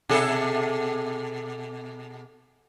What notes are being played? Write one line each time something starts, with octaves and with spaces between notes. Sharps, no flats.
B2 G#4 A4